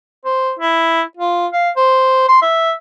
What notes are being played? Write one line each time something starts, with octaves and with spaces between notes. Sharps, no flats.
C5
E4
F4
F5
C5
C6
E5